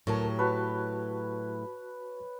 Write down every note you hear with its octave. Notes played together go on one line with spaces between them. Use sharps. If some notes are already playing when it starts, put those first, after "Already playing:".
C#2 A2 F#3 G4 A#4 C#5 A5
F#4 B4 A5 C#6